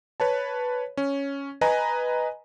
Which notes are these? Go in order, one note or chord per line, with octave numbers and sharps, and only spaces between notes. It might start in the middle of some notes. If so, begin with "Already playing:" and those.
B4 C#5 A5
C#4
B4 D#5 G#5 A#5